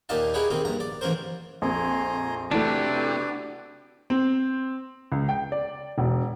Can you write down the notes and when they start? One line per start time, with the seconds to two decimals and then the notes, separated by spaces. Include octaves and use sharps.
0.09 D#2 A#2 D#4 G4 F5 A5
0.34 D#4 E4 G4 G#4 B4 C#5
0.50 D#3 C4 D#4 G4
0.65 A#1 G2 A#5
0.80 D5
1.01 A1 E3 C#4 A#4 C5
1.62 A#1 F2 G#5 A#5 C6
2.51 C3 E3 A3 D4 F#4 B4
4.10 C4
5.12 C#2
5.28 G5
5.52 D5
5.98 E1